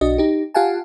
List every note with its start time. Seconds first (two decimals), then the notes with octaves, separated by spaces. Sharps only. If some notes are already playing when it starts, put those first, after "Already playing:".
0.01 B1 D4 F#4 D#5
0.18 D#4 G4
0.54 F4 G4 F5 F#5 G#5 A5